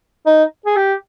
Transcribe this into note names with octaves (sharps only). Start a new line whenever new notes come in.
D#4
G#4
G4